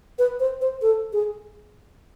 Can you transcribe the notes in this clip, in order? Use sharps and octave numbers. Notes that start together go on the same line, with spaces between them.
B4
C5
C5
A4
G#4